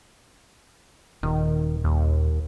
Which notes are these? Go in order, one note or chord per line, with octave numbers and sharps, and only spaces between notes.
D#1 D#3
D#2